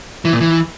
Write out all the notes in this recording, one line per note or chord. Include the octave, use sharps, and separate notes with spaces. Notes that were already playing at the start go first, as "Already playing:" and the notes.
E3
A#2
E3